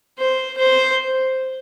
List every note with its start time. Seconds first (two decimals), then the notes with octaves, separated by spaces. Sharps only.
0.19 C5
0.57 C5